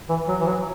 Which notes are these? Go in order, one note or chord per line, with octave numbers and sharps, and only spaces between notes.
E3
F#3
E3
F#3